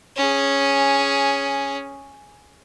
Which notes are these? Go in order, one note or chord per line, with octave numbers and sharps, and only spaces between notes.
C#4 G#4